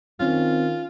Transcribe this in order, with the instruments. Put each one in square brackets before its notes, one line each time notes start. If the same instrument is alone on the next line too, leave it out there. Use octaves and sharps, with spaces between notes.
[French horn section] D#3 [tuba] C4 [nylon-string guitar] C#4 [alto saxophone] F4